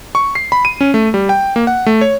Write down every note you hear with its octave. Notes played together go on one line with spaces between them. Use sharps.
C#6
C7
B5
D#7
C#4
A3
G3
G5
A#3
F#5
A3
C#5